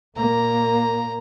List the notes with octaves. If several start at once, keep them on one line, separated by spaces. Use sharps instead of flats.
A#2 A#3 A#5